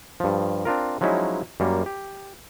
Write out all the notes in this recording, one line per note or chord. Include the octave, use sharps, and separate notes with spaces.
G2 F3
C4 D4 F4 A#4
F3 F#3 G#3 C#4 D#4 E4
F#2 G3 A#3
G4